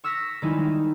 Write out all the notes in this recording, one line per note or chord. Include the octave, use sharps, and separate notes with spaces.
C#6 E6 F6 A#6 B6
D#3 G3 G#3 D#4 E4